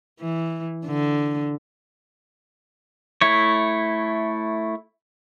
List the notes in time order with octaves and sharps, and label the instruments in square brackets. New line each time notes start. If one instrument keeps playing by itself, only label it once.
[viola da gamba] E3
D3
[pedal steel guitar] A3 E4 C#5